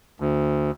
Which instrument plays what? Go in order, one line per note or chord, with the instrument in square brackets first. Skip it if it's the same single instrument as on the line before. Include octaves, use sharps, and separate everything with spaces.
[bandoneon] D2